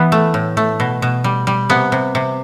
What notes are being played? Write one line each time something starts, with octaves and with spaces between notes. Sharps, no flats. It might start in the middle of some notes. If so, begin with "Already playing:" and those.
Already playing: E3 B3
A3
A2
A3
B2
B2
G3
G3
C3 B3
C3
C3